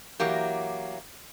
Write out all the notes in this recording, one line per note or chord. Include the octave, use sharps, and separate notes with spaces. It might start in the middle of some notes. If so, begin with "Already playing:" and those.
E3 F#3 A#3 G4